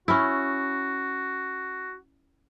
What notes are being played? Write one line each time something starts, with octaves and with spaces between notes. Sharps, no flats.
C#4 E4 F#4